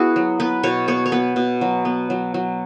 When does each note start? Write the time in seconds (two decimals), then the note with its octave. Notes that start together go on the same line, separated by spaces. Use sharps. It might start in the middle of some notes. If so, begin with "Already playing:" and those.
Already playing: B3 E4 F#4 G#4
0.16 F#3
0.40 B3 B4
0.63 B2 C#5
0.88 B3 C#5
1.06 C#5
1.12 B3 B4
1.36 B2
1.61 F#3
1.85 B3
2.10 F#3
2.34 F#3